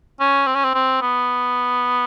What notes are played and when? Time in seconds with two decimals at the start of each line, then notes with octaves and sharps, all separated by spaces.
0.20 C#4
0.47 C4
0.55 C#4
0.64 C4
0.74 C4
1.01 B3